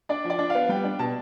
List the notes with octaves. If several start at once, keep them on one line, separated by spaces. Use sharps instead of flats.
D4 D5
F3
D5
D4
B3 F5
G3 G5
D4
B2 A5